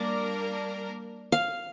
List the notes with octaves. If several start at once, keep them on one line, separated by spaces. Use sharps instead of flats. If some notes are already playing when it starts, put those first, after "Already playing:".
Already playing: G3 A#3 D4 A#4 D5
F5